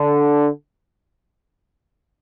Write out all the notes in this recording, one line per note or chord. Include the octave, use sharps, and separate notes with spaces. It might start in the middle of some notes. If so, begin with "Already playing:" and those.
Already playing: D3